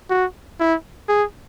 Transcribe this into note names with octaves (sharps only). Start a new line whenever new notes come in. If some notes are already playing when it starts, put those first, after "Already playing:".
F#4
E4
G#4